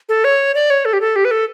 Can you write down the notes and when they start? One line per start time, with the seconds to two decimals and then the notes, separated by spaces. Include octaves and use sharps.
0.09 A4
0.24 C#5
0.55 D5
0.70 C#5
0.85 A4
0.93 G4
1.01 A4
1.16 G4
1.25 B4
1.31 A4